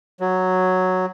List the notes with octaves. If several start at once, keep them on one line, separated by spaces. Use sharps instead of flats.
F#3